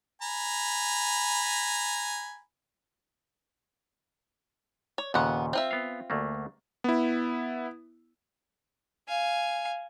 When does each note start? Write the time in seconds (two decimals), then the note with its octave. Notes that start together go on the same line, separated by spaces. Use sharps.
0.22 G#5 A#5 B5
4.98 C#5
5.14 D#2 A#2 C#3 B3 F#5
5.53 C4 F4 E5
5.71 B3 F5
6.10 D2 A3 A#3
6.84 B3 E4
9.08 F5 G#5